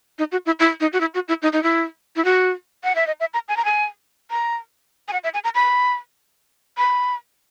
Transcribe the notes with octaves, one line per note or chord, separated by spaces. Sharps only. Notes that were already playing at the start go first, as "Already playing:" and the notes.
D#4
F#4
E4
E4
D#4
F#4
E4
F#4
E4
D#4
D#4
E4
E4
F#4
F#5
E5
D#5
E5
A#5
G#5
A#5
G#5
A#5
G#5
F#5
E5
G#5
A#5
B5
B5